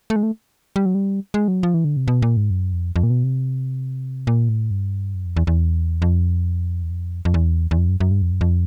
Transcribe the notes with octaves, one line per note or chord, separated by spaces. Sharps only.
A3
G#3
A3
G3
F#3
G3
G#3
F#3
F3
E3
D3
C3
B2
A#2
G#2
F#2
F2
F2
A#2
B2
C3
A#2
A2
G2
F#2
F2
E2
E2
F2
E2
F2
F2
E2
E2
F2
F#2
F#2
G2
F2
F#2
F2